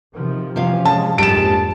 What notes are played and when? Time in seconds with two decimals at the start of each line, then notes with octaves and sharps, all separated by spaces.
0.15 C3 D#3 F3
0.56 C3 E3 F3 C#4 F5
0.85 G#3 A5
1.18 A#1 F2 G#2 G#3 G4 A5 D7 E7